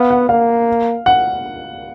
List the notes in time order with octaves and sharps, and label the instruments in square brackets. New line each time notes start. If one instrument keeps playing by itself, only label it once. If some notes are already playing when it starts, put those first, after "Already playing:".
Already playing: [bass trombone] B3 [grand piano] F5
[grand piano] F#5
[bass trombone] A#3 [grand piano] F5
[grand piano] F#5